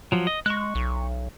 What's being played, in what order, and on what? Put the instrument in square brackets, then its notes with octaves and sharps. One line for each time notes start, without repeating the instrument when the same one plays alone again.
[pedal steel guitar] F3 F#3
D#5
[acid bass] G#3 [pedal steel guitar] C#6 F#6
[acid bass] B1